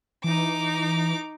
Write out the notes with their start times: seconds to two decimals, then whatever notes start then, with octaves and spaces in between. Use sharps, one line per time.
0.24 E3 D#4 D6